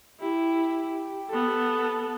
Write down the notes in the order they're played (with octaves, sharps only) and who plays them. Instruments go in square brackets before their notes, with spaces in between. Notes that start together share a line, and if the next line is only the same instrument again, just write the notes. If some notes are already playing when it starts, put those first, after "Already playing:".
[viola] E4 [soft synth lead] G4
[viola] B3 A4